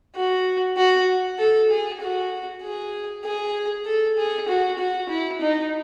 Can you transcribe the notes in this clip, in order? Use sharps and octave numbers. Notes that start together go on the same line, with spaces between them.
F#4
F#4
A4
G#4
F#4
G#4
G#4
A4
G#4
F#4
F#4
E4
D#4